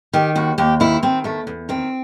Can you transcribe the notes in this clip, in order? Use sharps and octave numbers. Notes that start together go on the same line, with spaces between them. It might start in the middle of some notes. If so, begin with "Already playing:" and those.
D#3 G4
D#2 F#4
D#2 G4
D#3 E4
D#3 C4
E2 A3
E2
D#3 C4